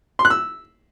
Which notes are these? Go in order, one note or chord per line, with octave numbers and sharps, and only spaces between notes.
C6
F#6
E6